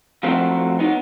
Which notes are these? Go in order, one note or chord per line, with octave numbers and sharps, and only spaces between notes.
F3 F#3 A3 C4 F#4
B3 D#4